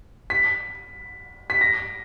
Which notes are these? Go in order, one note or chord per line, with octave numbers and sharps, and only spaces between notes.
B6
B6
A#6